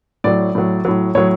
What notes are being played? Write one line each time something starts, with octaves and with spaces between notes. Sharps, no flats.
A2 F#3 D5
A2 F#3
A2 F#3
A2 F#3 C#5